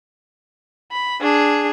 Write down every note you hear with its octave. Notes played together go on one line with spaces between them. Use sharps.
B5
D4 G#4